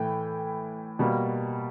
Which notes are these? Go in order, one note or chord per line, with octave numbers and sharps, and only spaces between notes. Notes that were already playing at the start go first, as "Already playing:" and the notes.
Already playing: A2 E3 A3 G5
B2 G3 A#3